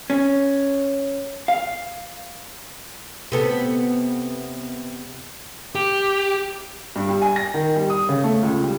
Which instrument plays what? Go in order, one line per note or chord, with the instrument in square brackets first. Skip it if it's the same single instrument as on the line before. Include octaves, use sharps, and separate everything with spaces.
[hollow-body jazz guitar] C#4
F5
[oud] C3 B3 A4
[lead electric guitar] G4
[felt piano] G2
G3
G#5
A#6
D#3
G3
D#6
C#3
A3
C#2
G3